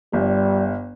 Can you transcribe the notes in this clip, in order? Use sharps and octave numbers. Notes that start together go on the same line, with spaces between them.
G1 G3